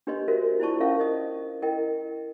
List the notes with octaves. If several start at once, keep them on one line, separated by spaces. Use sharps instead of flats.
D4 G4 B4 C#5 D#5 C6
F#4 A#4 C5 E5
E4 F4 C5 D5 A5 C#6
C#4 A#4 C#5 E5 F5 C#6
C5 D#5 D#6
E4 A#4 D#5 G5